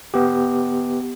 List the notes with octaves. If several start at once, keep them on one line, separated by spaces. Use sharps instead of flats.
B3 G4